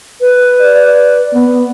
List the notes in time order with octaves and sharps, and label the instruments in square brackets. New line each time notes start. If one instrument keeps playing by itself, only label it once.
[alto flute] B4
[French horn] D5
B3